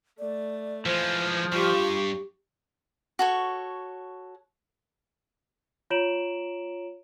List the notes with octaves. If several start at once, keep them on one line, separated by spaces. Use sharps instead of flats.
A3 D5
E3 F3 G#3 C5
G2 F4 G4 C#6
F#4 A4 C#5
F4 C#5 A#5 D7 E7 F#7